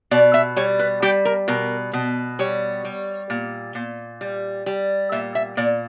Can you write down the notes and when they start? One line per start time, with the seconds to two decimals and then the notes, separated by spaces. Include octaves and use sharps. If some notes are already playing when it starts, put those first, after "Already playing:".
0.11 B2 D5
0.34 E5
0.56 G3 C#5
0.79 B4
1.02 G3 G4
1.25 A#4
1.48 B2 A#4
1.93 B2
2.39 G3 C#5
2.85 G3
3.30 A#2
3.75 A#2
4.21 G3
4.66 G3
5.12 A#2 E5
5.35 E5
5.57 A#2 D5